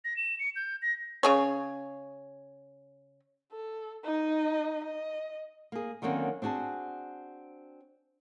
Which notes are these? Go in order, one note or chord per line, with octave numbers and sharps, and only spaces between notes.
A#6
E7
C#7
G6
A#6
C#3 G#4 C#5
A4
D#4 D#5
D#5
A#3 G#4
D3 D#3 F#3 A#3 C4 C#4
C4 D4 F#4 G#4 A5